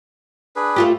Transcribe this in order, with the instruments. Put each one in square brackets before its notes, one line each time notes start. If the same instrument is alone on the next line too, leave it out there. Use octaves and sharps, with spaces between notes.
[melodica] D4 G#4 B4
[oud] A3 F4 G4